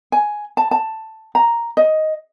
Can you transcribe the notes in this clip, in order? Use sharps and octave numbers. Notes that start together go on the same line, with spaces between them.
G#5
A5
A5
A#5
D#5